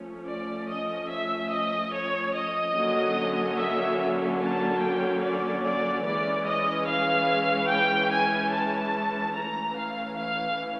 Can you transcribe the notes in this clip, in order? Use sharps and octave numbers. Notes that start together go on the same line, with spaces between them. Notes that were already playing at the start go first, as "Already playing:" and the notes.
Already playing: F3 A3 C#4
D5
D#5
E5
D#5
C#5
D#5
D3 F#3 A#3 C#4
E5
A5
G5
D5
D5
E3 G#3 C#4 D5
D#5
F5
G5
G#5
A5
E3 A3 C#4 A#5
F5
F5